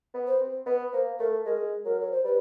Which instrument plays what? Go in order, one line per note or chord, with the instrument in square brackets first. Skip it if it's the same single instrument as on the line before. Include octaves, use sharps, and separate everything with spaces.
[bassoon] B3
[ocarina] C5
[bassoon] C4
[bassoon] B3 [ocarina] B4
[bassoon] A#3 [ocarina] C5
[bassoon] A3 [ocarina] A#4
[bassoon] G#3 [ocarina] A#4
[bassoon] F#3 [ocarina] A#4
[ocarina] C#5
C5
[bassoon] G3 [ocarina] B4